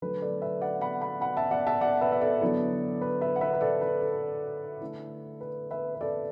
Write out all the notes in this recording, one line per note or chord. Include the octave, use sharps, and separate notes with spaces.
D3 F#3 A3 B4
A4 D5
B4 E5
D5 F#5
F#5 B5
F#5 B5
F#5 B5
E5 A5
D5 F#5
E5 A5
D5 F#5
B4 E5
E5
A4 D5
D3 F#3 B3 E4
B4
B4 E5
F#5
B4 E5
B4
A4 D5
B4
A4
D3 A3 E4
B4
B4 E5
B4
A4 D5